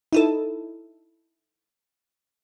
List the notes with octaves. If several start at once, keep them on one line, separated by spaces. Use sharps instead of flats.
D#4 E4 A4